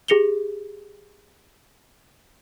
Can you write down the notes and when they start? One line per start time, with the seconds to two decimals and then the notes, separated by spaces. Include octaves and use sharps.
0.08 G4 G#4 A#6 C#7 F7 G7